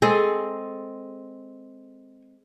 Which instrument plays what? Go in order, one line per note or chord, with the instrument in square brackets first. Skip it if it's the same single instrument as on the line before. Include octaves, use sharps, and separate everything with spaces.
[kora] G#3 C4 A4 [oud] G#4